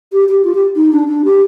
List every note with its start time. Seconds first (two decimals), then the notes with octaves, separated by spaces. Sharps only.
0.12 G4
0.28 G4
0.44 F4
0.55 G4
0.76 D#4
0.92 D4
1.08 D4
1.24 G4